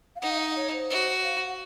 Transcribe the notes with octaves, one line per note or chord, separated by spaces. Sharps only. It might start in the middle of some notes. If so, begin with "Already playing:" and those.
F5
D#4 F#5
F5
D#5
C#5
C5
F#4
F5
F#5